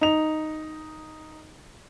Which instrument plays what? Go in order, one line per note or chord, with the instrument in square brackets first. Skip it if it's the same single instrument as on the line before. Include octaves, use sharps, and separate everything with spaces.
[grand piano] D#4 F7